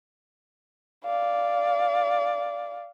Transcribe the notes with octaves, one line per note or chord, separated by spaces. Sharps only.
D5 F5